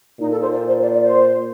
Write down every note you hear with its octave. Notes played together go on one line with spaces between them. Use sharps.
A#2 D#4
A4
C5
D5
C5
D5
D5
C5